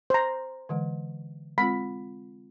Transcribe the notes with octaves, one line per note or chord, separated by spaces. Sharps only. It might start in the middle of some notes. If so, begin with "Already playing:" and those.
C5 A#5
D3 E3 G#3
G#3 C4 F4 B5